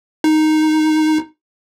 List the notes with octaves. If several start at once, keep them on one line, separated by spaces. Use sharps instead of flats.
D#4